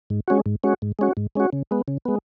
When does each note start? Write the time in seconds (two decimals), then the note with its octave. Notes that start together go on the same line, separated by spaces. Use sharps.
0.10 G#2
0.28 G#3 C#4 F#4
0.46 G#2
0.63 G#3 C#4 F#4
0.82 G#2
0.99 G#3 C#4 F#4
1.17 G#2
1.35 G#3 C#4 F#4
1.53 C#3
1.71 G#3 B3
1.88 C#3
2.05 G#3 B3